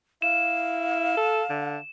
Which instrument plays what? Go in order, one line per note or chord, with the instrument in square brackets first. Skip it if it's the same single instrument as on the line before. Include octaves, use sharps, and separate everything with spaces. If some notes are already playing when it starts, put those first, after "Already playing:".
[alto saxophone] E4 [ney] F5 [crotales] E7
[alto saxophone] A4
D3